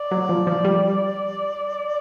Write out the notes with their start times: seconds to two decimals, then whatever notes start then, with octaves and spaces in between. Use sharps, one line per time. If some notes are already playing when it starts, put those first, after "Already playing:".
Already playing: D5
0.11 F#3
0.29 F3
0.47 F3
0.65 G3